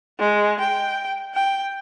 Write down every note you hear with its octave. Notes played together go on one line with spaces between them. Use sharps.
G#3
G5
G5